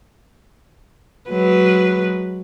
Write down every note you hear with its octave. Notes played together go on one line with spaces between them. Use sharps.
F#3 G#3 B4